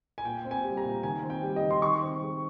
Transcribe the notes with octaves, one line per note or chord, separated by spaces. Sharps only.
G#5
A#2 G5
C4
G#5
G3
A#5
A#2
D#3 G#5
C4
G5
G3
D#5
D#3
C6
D#3 C#6
C4
G#3